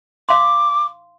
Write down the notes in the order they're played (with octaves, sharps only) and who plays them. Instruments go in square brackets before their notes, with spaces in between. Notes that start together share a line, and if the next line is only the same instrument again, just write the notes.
[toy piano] F5 C6 [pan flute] D6